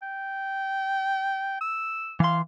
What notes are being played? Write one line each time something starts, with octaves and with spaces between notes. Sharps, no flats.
G5
E6
E3 F5 C6